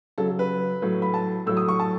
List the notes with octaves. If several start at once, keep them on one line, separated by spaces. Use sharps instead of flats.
C#3 F#3 A4
A4
B4
A2 F#3
B5
A5
A2 F#3 E6
D#6
C#6
A5